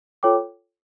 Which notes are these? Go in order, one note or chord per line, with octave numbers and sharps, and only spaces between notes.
F4 A4 C#5 G5 D6